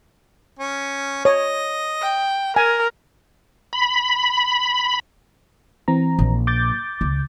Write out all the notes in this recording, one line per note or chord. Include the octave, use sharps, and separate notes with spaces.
C#4
C#5 D#5
G5
A#4 G#5
B5
E3 C4 A#5
A#1
D6 G6 A6
C#2